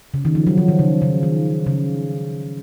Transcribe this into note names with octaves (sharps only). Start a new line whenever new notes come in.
C#3
D#3
F3
F#3
F3
D#3
C#3
C#3
D#3
C#3